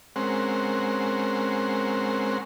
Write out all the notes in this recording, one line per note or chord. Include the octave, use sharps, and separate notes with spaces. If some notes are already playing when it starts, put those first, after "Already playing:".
G#3 C4 C#4 A#4 C5 F#5